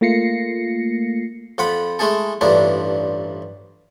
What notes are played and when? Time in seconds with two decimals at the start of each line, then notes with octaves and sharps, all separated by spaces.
0.01 A3 A#3 F4 A#6 C7 C#7
1.58 F2 F4 F#5 B5
1.99 G#3 A3 E4 G#4 A4
2.41 A1 G2 F3 D4 E4